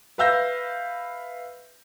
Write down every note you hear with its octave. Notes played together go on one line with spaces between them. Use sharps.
B4 E5 F5 E6 G6 A#6